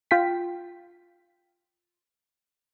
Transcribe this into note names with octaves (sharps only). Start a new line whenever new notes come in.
F4 G5 B6